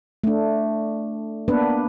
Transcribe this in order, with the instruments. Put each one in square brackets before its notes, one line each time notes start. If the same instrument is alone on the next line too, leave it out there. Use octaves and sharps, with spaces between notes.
[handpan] A3 D4
A#3 B3 D4 B4